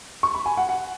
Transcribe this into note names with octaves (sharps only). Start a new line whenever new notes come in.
C#6
B5
G#5
F#5
F#5